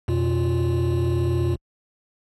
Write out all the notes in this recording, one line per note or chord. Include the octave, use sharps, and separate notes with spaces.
F2 B2 F4